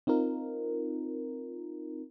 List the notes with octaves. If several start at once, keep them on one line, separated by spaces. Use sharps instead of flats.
C4 D#4 F4 A#4